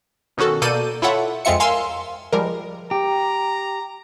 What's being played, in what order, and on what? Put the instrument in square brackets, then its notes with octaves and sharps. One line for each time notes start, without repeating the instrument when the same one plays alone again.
[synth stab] B2 D#3 C#4 F#4 A4
B2 A#3 A4 D5 G6 D#7
E4 F4 A4 C#5 E5 F#5
F2 G#3 C4 F4 E5 C#7
A#4 F5 G#5 C6 E6
F3 G3 G#3 A#4
[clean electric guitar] G4 [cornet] A#5